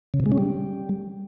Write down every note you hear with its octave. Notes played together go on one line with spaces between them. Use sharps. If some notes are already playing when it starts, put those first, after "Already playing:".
C#3
C3
G#3
C#4
G3